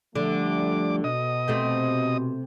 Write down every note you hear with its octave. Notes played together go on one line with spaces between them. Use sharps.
D3 F3 G3 A3 D6
B2 D#5 D#6
C3 A3 C4